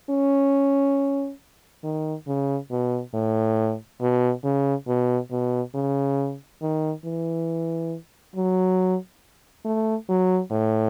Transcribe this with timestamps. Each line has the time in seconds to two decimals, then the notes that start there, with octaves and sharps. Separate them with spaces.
0.10 C#4
1.84 D#3
2.27 C#3
2.71 B2
3.14 A2
4.01 B2
4.44 C#3
4.87 B2
5.31 B2
5.75 C#3
6.62 D#3
7.05 E3
8.36 F#3
9.65 A3
10.09 F#3
10.52 A2